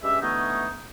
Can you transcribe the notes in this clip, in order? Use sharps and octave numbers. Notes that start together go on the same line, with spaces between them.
G2 G#3 C#4 G4 E5
D3 E3 A3 B3 C#4 D#4